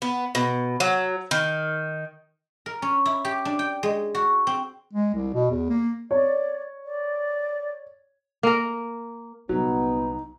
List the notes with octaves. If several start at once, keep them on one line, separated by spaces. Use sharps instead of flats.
B3
B2
F#3
D#3
A#4
C#4
E4
G4
D4
G5
G#3
F#4
C4
G#3
C2
B2
E2
A#3
C#5 D5
D5
A#3 A#4
C2 A#2 F#3 B3 D#4